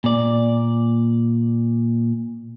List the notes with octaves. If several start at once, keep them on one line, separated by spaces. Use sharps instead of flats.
A#2 D5